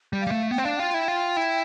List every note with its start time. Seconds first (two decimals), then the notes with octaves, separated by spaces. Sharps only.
0.13 G3
0.21 F5
0.27 G3
0.31 A3
0.51 B3 G5
0.58 C4
0.64 D4 F5
0.77 F4 G5
0.94 E4
1.08 F4
1.37 E4